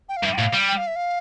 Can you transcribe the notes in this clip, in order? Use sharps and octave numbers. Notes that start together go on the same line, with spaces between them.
G5
F5
G2 E5
G5
A2 F5
G3
G5
F5
E5
F5